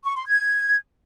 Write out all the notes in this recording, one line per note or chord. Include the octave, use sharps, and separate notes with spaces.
C#6
C6
G#6